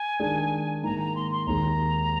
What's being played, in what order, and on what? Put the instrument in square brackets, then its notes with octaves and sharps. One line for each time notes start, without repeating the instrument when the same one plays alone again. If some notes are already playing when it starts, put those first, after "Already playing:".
Already playing: [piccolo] G#5
[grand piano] D#3 G#3 D4 G#4
[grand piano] G#2 D#3 A#3 [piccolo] A#5
[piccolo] A#5
C6
C6
[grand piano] D#2 D#3 G#3 [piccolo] A#5